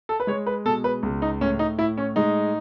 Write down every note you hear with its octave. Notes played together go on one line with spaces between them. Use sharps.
A4
B4
G#3 C#5
B4
B2 A4
B4
C#2
D#4
A2 C#4
D#4
A2 E4
C#4
G#3 D#4